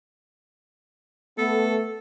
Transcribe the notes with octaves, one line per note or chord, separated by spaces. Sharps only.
A3 B3 A4